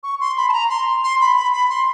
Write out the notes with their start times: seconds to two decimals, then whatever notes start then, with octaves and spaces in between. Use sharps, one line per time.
0.03 C#6
0.20 C6
0.37 B5
0.49 A5
0.53 A#5
0.70 C6
1.04 C6
1.21 B5
1.37 B5
1.53 B5
1.70 C6